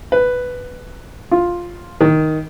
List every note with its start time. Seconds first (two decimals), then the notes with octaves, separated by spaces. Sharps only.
0.12 B4
1.31 F4
2.01 D#3